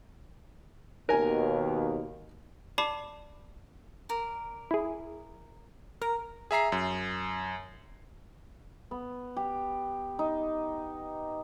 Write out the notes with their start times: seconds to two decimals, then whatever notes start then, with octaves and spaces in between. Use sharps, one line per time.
1.09 D#2 B2 A#4 G#5
2.78 D5 A5 B5 D6 C7 E7
4.09 A#4 D5
4.71 E4 G#4
6.02 A#4 A#5
6.51 G#4 E5 A#5 C7
6.72 F#2
8.91 B3
9.36 G4
10.19 D#4